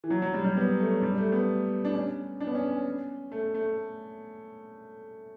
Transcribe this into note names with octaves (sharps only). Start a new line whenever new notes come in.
E3
F#3
F#3
G3
G3
B3
A3
G3
A3
B3
D4
C#4
D4
B3
C#4
C#4
A3
A3